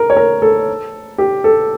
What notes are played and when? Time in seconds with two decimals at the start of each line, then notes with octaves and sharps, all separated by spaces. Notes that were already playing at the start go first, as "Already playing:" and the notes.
Already playing: A#4
0.10 C#5
0.17 A#4
0.42 A4
1.18 G4
1.44 A4